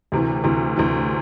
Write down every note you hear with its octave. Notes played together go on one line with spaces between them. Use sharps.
D2 C3 E3
D2 C3 E3
D2 C3 E3